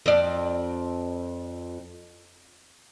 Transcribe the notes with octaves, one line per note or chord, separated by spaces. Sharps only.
F2 D5